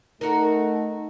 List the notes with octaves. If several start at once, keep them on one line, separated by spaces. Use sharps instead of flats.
A3 D#4 F#4 A#4